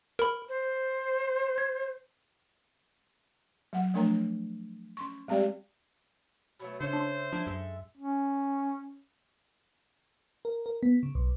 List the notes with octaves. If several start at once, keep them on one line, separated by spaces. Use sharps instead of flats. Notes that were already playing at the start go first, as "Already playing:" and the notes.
A#4 B5
C5
G#6
F#3 F#5
F3 A3 D4 A#4 C#5 A#5
C#4 C6 C#6
G3 G#3 C4 G4 D5 G5
B2 F#3 A3
C#3 D4 A4 C5 C#5 E5
D4 C6
F3 A#3 D4 E5 A5
F#2 G#3 A4 E5
C#4
A#4
A#4
B3
C#3
B1